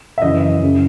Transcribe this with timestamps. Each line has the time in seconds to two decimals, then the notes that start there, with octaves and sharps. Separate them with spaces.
0.18 E5
0.22 F#2 C#3 E3 D#5
0.62 F#2 C#3 E3